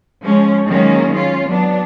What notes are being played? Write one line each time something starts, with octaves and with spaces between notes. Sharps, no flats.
F3 G#3 C#4
D#3 F#3 G#3 A#3 C#4
C#4 F4
F#3 B3 D4